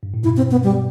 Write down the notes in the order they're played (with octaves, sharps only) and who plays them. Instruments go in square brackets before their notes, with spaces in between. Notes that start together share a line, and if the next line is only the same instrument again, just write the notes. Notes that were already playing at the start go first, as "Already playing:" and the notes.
[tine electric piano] G2
A2
[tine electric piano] G2 B2 [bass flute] E4
[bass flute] C4
B3
G3